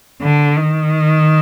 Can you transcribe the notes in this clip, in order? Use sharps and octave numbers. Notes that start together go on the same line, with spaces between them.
D3
D#3